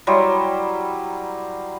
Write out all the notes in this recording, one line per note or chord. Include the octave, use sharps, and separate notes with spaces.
F#3 G3 E4 C5